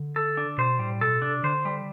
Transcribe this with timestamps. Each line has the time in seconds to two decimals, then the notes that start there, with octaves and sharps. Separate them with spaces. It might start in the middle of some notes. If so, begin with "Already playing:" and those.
Already playing: D3
0.16 A4
0.37 D4
0.58 B2 C5
0.79 A2 G3
1.01 B2 A4
1.22 C3 D4
1.43 D3 C5
1.65 G3